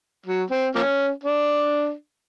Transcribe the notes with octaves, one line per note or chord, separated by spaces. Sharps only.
F#3
C4
F3 A#3 C#4
D4